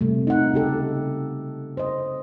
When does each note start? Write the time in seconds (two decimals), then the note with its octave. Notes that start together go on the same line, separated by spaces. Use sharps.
0.01 C3 G3 A3
0.27 D#4 F#5
0.54 C#3 G4 A4
1.77 C5 D#5